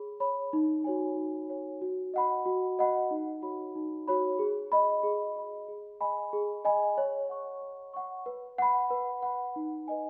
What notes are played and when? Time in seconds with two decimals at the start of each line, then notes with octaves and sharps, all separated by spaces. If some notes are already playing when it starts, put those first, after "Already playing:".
Already playing: G#4 C#5 B5
0.20 C#5 B5
0.53 D#4
0.84 F#4 C#5 G#5
1.17 D#4
1.49 F#4 C#5 G#5
1.82 F#4
2.14 D#5 F#5 B5
2.46 F#4
2.79 D#5 F#5 B5
3.11 D#4
3.42 F#4 C#5 B5
3.75 D#4
4.08 F#4 C#5 B5
4.39 G#4
4.72 D#5 B5
5.03 G#4
5.36 D#5 B5
5.68 G#4
6.01 D#5 G#5 B5
6.33 G#4
6.65 D#5 G#5 B5
6.98 C#5
7.29 F#5 C#6
7.62 C#5
7.94 F#5 C#6
8.26 B4
8.58 F#5 B5
8.91 B4
9.22 F#5 B5
9.56 D#4
9.88 B4 D#5 G#5